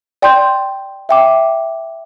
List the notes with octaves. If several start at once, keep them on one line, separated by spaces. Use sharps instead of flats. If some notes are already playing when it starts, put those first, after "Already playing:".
D5 G5 C6 G6
E5 G5 D6